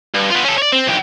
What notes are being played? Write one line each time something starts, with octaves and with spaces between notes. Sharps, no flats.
G2
B3 F4
C#4 A4
C#5 D5
C4
B1 G4